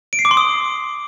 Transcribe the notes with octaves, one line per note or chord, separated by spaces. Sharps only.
D7
C7
D6
C6
D#6